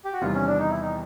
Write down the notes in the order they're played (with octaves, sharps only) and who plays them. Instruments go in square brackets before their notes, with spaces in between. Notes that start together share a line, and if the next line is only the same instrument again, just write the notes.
[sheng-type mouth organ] G4
F#4
[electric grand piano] E2 C3 D#3 G3 [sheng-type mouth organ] F4
[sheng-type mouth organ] C#4
D4
D#4
E4
D#4